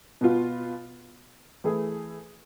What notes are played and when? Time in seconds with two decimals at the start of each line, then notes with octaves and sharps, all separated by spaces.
0.21 B2 B3 F4
1.64 E3 A3 E4 G#4